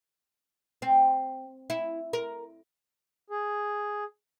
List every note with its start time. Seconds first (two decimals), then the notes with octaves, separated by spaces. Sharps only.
0.82 C4
1.70 E4
2.13 A#4
3.30 G#4